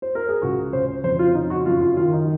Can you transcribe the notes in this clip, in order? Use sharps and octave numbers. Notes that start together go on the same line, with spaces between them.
C5
A#4
G#4
C#2 F#4
C#3 C5
F2 C5
F4
C#3 D#4
F#4
F#2 F4
F4
D#3 F4
D#4